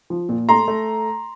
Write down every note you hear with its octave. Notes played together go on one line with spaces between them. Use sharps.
F3
A#2
A3 A#5 C6
A3